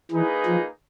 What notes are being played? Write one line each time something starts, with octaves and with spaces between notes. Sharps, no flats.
E3 A#3 D#4 G#4 B4
F3